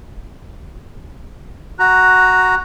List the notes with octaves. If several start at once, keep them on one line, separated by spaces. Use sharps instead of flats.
F#4 A#5 F#6